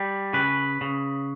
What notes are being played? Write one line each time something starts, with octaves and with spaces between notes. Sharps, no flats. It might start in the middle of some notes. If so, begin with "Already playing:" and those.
Already playing: G3
C#3 B4
C#3